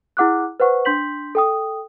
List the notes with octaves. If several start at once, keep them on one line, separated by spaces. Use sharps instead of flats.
E4 G#4 F#5 D6 F6 F#6
B4 C5 F#5 C#6
D4 C6 G6 B6 F#7
A4 G5 D#6